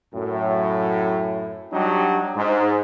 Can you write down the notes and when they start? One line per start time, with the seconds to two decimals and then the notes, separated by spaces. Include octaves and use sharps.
0.13 F#2 A2
1.72 F#3 G3 D4 D#4 F#4 G4
2.36 G#2